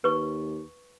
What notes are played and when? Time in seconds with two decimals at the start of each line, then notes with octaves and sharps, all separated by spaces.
0.04 D#2 B4 C#6